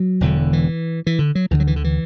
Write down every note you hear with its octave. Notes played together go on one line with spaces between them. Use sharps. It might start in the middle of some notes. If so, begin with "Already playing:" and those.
Already playing: F#3
E1 E2 D3
E3
E3
D3
F#3
D2 D3 E3
F#3
E3
D3
E3